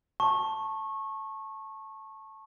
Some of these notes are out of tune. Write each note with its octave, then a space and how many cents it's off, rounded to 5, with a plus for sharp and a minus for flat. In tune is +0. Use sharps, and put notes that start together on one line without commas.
A5 +0 C#6 -20